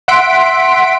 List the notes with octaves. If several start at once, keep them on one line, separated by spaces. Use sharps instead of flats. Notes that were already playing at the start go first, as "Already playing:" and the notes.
E5 F#5 C6 B6 D7